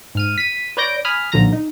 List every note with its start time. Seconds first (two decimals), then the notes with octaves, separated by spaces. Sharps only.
0.15 G#2 F6 D#7
0.38 B6 D#7
0.77 B4 C#5 D5 G6 A#6 D7
1.05 G#5 B5 D#6 F6
1.32 B1 A#2 D3 F3 A#5 A#6
1.53 D#4